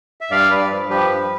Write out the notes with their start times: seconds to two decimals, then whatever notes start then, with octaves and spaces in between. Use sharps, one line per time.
0.21 E5
0.31 G2 D5 F5
0.50 G2 B4 D5
0.70 F3
0.90 F3 G4 B4
1.09 G2